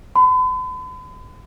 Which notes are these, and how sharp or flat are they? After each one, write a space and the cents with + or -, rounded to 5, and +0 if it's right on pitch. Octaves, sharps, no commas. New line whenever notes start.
B5 +45